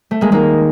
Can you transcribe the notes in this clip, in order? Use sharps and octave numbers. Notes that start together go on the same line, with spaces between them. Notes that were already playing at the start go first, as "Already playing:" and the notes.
A3
G#3 A#3
D#3 G#3 A#3